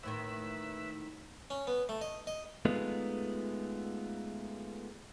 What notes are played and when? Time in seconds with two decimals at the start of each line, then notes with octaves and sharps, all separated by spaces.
0.03 D#2 A2 D#3 E4 B4 E5
1.50 C#4
1.67 B3
1.89 A3
2.01 D#5
2.27 D#5
2.65 G#3 A3 B3 D#4 F4